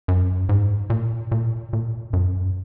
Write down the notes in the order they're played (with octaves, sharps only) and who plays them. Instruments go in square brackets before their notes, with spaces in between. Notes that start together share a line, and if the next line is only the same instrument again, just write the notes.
[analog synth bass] F#2
G#2
A#2
A#2
A#2
F#2